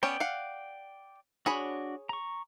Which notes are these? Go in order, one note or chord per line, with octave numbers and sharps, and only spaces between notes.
B3 C#4 C#5 D5 G5
F5 F#5
D4 F#4 G#4 C#5 B5
A#5 C#6